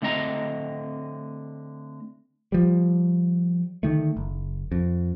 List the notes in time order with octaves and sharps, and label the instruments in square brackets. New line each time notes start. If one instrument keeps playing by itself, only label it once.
[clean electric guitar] D3 A3 C4 D#5 A#5
[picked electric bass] F3 G3
D3 D#3 A3
F#1
F2